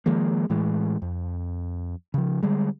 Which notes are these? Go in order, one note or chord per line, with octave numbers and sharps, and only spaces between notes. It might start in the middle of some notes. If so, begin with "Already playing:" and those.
D#3 F3 G#3 A#3
A2 E3 G#3
F2
C#3 F3
D3 G3 G#3